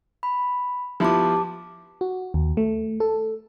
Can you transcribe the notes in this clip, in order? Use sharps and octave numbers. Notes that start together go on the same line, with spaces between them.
B5
F3 B3 E4 G4 A5 D6
F#4
D#2
A3
A4